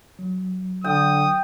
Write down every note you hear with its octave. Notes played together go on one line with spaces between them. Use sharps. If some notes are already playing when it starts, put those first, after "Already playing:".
F#3
D3 G5 D#6